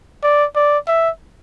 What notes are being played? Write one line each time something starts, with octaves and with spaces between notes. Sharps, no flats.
D5
D5
E5